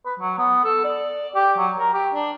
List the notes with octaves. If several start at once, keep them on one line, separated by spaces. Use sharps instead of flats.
B4
F#3
B3
A4
D5
G4
F#3
A#4
G4
D4